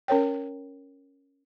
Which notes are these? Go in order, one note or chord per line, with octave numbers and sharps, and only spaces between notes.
C#4 A#4 C#5 G5